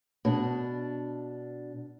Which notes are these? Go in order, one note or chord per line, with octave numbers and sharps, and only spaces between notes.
B2 D4